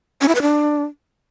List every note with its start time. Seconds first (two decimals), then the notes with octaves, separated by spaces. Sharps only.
0.21 C#4
0.28 E4
0.35 B4
0.42 D4